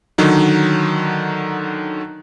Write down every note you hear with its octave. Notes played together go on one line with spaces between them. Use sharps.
D3 D#3 F#3 D#4